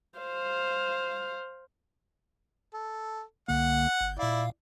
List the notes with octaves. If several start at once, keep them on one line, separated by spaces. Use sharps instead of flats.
C5 F5
A4
C2 D3 A#3 F#5
G1
A#2 E4 D5 F5